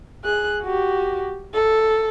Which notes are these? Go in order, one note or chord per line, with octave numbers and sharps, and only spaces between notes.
G#4 F#6
F#4 G4
A4